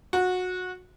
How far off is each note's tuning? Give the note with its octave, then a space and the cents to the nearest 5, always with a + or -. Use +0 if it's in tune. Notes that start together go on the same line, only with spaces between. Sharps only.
F#4 -20